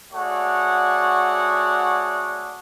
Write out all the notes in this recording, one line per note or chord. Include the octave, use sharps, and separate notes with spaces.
A3 F#4 G#4 C#5 D5 F#5